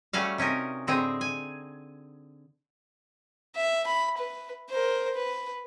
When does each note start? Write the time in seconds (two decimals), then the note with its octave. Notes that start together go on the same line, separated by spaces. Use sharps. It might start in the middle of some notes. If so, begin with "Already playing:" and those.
0.13 G3 A3 C#4 F#4 F5
0.38 C3 C#4 D#4 A#4
0.87 A2 D3 C4 D#4 G#4 A#5
1.21 G#5
3.56 E5
3.87 B5
4.18 B4
4.70 A#4 C5
5.15 B4